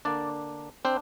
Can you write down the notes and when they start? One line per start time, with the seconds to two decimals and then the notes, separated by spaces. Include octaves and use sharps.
0.05 D3 A#3 D4 D5
0.85 C4 D4 C5